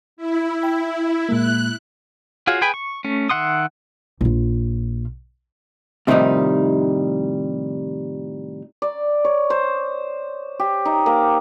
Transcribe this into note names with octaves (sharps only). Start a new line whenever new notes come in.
E4
G5
A#2 G#3 A#3 F#6
F4 F#4 G#4 C#5 F5
G#4 B4 G5 G#5 B5
C#6
A3 C#4
D#3 E5 F#5 C6 D#6
A#1 F4
A2 C3 D#3 F3 G3 D#4
D5
C#5
C5
G4
D#4
A#3